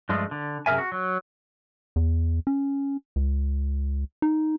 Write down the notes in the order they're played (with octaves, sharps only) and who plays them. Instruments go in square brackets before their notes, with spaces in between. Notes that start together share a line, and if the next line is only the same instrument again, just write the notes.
[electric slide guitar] G2 F3 G#3 A3
D3
F#2 C3 G#4 A#4 E5 G#5
F#4
F#3
[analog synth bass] E2
C#4
C#2
D#4